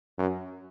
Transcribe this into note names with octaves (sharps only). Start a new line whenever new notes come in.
F#2